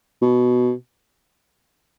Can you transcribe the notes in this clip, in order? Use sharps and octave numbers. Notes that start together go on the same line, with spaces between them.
B2